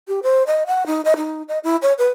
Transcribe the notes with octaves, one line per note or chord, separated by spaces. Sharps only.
G4
C5
D#5
F#5
D#4
D#5
D#4
D#5
E4
C#5
B4